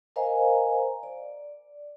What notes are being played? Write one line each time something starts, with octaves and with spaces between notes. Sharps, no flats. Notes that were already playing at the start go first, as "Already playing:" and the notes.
A#4 C5 D#5 F5 G#5 A#5
D5